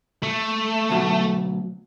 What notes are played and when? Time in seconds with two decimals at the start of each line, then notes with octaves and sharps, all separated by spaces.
0.23 A3
0.90 D2 B2 F#3